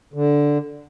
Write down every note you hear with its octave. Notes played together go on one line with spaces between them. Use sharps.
D3